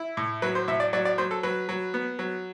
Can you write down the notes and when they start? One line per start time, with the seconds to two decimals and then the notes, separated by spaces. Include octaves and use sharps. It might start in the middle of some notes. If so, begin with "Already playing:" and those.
Already playing: E4
0.17 A2
0.42 F#3 B4
0.55 C5
0.68 A2 E5
0.80 D5
0.93 F#3 D5
1.05 D5
1.18 F#3 C5
1.31 A4
1.43 F#3 B4
1.69 F#3
1.94 B3
2.19 F#3